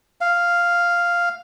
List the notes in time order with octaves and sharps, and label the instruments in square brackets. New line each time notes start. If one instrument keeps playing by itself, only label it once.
[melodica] F5